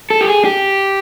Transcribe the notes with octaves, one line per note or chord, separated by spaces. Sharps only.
A4
G4
G#4
G4